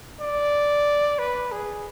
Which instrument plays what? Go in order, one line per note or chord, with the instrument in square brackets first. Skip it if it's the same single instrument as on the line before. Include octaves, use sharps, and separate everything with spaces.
[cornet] D5
B4
G#4